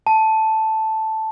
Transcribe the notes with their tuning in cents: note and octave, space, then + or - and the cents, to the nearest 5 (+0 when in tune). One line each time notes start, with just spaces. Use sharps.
A5 +0